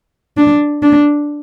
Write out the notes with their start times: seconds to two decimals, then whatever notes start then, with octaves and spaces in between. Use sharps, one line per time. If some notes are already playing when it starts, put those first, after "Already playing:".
0.37 D4
0.83 D4